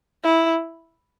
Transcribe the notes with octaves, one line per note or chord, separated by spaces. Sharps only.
E4